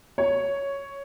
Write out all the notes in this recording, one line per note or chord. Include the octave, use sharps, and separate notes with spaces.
C#5